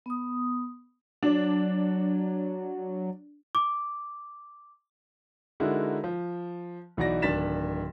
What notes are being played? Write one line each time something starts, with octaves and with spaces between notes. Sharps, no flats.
B3 D#6
F#3 D4
D6
D3 G#3 D#4 E4 F#4 A#4
F3
B1 E3 D#4 F#4 D5 A#6
D1 D#3 D4 A6 B6 E7